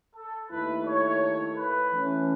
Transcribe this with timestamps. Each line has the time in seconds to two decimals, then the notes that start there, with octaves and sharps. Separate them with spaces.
0.16 A4
0.51 D#2 D#3 A3 E4 B4
0.87 C#5
1.57 B4
1.93 E3 A3 C#4